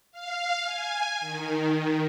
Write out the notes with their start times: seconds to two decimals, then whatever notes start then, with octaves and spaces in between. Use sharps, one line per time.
0.12 F5
0.63 G#5
1.20 D#3